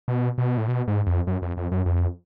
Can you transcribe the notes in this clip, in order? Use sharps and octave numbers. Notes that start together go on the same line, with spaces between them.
B2
B2
A2
B2
G#2
F2
F#2
F2
F2
F#2
F2